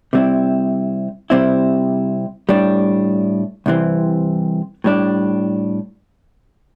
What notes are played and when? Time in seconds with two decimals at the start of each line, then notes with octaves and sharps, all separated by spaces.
0.13 C3 G3 C4 E4
1.30 C3 G3 C4 E4
2.49 A2 G3 D4
3.66 C2 C3 E3 C4
4.84 A2 G3 D4